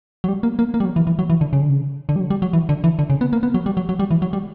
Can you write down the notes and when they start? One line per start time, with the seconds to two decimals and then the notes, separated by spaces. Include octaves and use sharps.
0.24 F#3
0.28 G3
0.43 A#3
0.59 A#3
0.74 A#3
0.80 G3
0.85 F#3
0.96 E3
1.07 E3
1.19 F#3
1.30 E3
1.41 D3
1.53 C#3
1.61 D3
1.69 C#3
2.09 D3
2.16 G3
2.20 F#3
2.30 G3
2.42 F#3
2.53 E3
2.69 D3
2.84 E3
2.99 D3
3.10 C#3
3.21 B3
3.33 A#3
3.43 B3
3.54 F#3
3.66 G3
3.77 F#3
3.89 F#3
3.99 G3
4.11 E3
4.22 F#3
4.33 G3